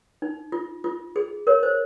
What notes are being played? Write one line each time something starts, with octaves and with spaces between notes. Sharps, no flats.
D#4
F4
F4
G#4
A#4 C#5
C5